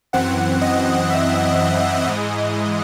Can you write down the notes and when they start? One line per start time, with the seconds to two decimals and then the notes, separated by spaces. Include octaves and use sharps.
0.13 F#2 E3 C4 F#5
0.62 D#5
1.10 E5
1.59 E5
2.06 G#2 E3 G#3 D#5